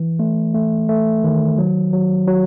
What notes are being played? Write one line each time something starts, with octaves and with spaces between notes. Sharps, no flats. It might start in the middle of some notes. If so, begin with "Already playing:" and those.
Already playing: E3
A3
A3
A3
D#3
F#3
F#3
F#3